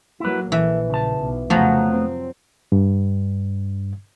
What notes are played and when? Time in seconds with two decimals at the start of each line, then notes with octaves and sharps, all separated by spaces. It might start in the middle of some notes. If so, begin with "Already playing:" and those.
0.20 F#3 A#3 E4 B4
0.52 A#1 E3 A4 E5
0.90 C#3 A5
1.20 B1
1.50 F1 C#3 F3 F#3 A3 B3 A#5
1.90 C4
2.72 G2